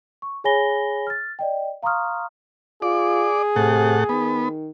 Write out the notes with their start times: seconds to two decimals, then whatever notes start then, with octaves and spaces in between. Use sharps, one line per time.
0.22 C#6
0.44 G#4 C#5 G#5 B5 A#6 G7
1.07 F6 A6
1.39 D5 D#5 G5
1.83 F5 A#5 C6 C#6 D#6 F6
2.82 F4 G#4 D5
3.56 A2 C3 A4 F#5
4.09 D#3 B3